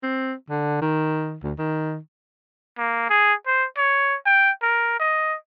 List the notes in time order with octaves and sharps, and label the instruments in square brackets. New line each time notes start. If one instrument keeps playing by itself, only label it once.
[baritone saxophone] C4
D3
D#3
D2
D#3
[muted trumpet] A#3
G#4
C5
C#5
G5
A#4
D#5